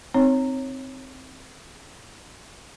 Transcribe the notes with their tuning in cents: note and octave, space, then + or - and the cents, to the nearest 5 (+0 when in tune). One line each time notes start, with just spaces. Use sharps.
C4 +0 D#4 +0 C#5 -15